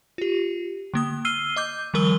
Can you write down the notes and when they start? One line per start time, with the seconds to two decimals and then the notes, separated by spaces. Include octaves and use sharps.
0.18 F4 G4
0.94 D3 A#3 D#6
1.25 E6 F6 C7 D#7 G7
1.56 D#5 D6 G6
1.94 D#3 F3 G3 A#4 E6 G7